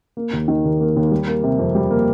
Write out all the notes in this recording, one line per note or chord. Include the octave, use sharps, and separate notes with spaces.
A#3
D#2
D#3
D#2
A#3
D#2
G3
A#3
C3
F2
G3
A#3